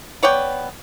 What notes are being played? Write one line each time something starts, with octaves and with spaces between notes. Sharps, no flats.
B3 C#5 D5 G5